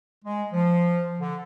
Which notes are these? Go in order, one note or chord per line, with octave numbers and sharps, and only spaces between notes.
G#3
F3
D3